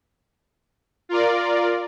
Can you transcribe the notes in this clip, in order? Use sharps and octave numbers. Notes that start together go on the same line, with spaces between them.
F4 A#4 D5